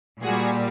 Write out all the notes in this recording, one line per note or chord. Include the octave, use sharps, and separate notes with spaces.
A#2 G3 F#4 G#4